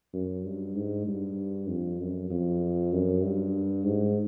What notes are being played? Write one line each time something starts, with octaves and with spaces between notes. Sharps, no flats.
F#2
G2
G#2
G2
F2
F#2
F2
F#2
G2
G#2